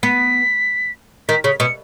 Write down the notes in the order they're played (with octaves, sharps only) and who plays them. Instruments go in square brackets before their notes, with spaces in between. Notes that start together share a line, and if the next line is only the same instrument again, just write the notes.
[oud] B3 [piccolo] B6
[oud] D#3 [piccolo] B6
[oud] C#3 [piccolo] B6
[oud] B2 [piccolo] C#7